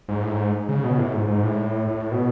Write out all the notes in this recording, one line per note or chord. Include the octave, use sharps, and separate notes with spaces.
G#2
A2
G#2
C#3
B2
A2
G#2
G#2
A2
A2
B2